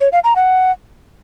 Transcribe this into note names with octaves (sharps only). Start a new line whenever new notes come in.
C#5
F5
A#5
F#5